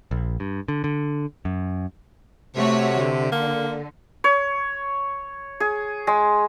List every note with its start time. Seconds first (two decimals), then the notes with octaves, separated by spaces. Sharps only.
0.11 A#1
0.40 G2
0.68 D3
0.84 D3
1.45 F#2
2.56 C3 A3 F#4 C#5
2.97 D3
3.32 A#3
4.24 C#5
5.60 G#4
6.07 G#3